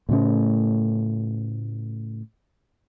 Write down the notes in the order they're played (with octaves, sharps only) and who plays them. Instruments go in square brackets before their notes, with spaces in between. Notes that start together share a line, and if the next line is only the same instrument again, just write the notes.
[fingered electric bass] A2 C#3 A3 C#4